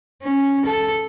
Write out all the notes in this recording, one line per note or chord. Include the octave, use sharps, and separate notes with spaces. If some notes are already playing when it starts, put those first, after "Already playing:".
C#4
A4